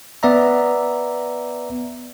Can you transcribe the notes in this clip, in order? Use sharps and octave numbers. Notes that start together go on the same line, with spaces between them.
B3 D5 E5 A#5